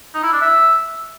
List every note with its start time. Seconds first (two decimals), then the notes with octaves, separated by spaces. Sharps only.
0.14 D#4
0.23 E4
0.32 D4
0.41 E5